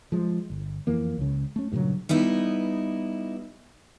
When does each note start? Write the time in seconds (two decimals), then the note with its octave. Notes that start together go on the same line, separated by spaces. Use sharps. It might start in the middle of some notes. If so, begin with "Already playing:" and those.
0.12 F3 G#3
0.50 G1
0.87 F2 E3 A#3
1.18 C#2 C#3
1.56 A3 C#4
1.72 G2 A#2 C#3 F#3
2.09 G3 B3 D#4 E4